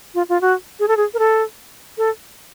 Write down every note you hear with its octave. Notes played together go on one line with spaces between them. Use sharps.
F4
F4
F#4
G#4
A4
G#4
A#4
A4
A4